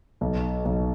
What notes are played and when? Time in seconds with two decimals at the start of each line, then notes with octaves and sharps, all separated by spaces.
0.21 B1
0.65 B1